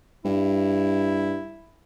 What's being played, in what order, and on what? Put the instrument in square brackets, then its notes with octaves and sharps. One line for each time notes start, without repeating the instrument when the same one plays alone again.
[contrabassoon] G2 [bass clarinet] E4